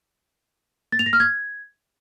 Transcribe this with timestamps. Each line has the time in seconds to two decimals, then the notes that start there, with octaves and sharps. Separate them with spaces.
0.92 A6
0.99 F7
1.06 A#6
1.13 F6
1.20 G#6